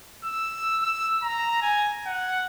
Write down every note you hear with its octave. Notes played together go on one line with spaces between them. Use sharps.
E6
E6
A#5
G#5
F#5